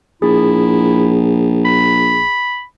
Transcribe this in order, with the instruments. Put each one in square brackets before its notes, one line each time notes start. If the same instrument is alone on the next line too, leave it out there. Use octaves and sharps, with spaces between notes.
[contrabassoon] A#1 [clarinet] E4 [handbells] G#4
[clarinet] B5